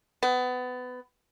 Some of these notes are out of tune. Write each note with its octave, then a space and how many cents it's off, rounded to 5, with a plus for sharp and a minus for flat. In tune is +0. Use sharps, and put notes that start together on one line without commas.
B3 +25